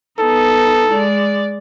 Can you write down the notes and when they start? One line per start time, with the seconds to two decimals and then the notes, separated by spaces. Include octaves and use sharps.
0.20 B3 D#4 A4
0.91 G#3 D5